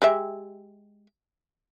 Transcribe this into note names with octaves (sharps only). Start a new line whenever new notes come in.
G#3 G4 E5